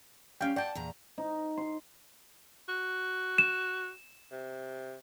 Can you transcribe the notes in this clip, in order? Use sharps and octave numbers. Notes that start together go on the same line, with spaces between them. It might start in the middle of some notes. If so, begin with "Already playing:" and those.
G3 C#4 F5 G5
D5 F#5 G5 A5
E2 A#2 A#5
D#4
C6
F#4
E7
C3